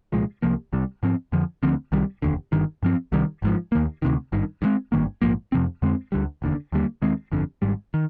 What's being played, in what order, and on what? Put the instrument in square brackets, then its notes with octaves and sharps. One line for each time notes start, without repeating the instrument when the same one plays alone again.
[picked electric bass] C2 A#2 F3 G#3
C2 C3 F3 A#3
C2 C3 G3
G#2 F3 C4
F2 D3 F3
D2 D3 F3 C4
C2 C3 D#3 G3
F1 D#2 D3
G1 G2 D#3
G2 F3 C4
C2 C3 D#3 G3
G#1 G#2 F3
D#2 D#3 A#3
D2 C3 D#3
G#1 G2 D#3
G2 D3 G#3 C4
G#1 G2 D#3 A#3
A#1 G#2 F3 A#3
F2 C3 F3 C4
F2 D3 G#3 C4
D2 D3 G3
F1 D#2 D3
D#2 D3 G3 A#3
D#2 D#3 G#3 C4
G1 F2 D3
G#1 G#2 G3
D#3